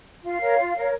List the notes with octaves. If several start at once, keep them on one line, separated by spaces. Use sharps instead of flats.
F4 F5
A#4 C#5
F4
A#4 C#5